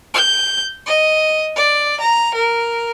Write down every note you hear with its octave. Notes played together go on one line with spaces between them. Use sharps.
G6
D#5
D5
A#5
A#4